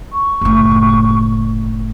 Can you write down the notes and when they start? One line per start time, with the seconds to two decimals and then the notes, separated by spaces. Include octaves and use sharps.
0.12 C#6
0.41 F#1 A2